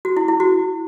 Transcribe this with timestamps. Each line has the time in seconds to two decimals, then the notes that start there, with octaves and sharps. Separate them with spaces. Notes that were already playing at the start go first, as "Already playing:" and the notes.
0.05 F#4
0.17 E4
0.28 E4
0.40 F#4